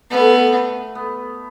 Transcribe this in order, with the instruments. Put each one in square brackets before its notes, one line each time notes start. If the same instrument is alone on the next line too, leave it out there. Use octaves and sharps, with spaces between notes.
[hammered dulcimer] A3 [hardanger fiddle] B3
[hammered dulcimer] B3